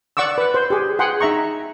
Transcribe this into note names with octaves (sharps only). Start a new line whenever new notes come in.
D5 F#5 C#6 D6 E6
B4
C5
G4 G#4
G#4 F#5 G5 C6
D#4 E5 A#5 C#6